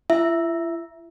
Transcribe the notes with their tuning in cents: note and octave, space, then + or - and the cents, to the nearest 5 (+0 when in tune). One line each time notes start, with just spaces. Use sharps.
E4 +45 E5 +0